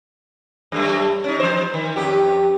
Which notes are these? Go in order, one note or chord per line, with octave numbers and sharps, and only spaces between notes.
F#2 G3 A3
C#4 D#4
F3 C5
D#3
F2 G4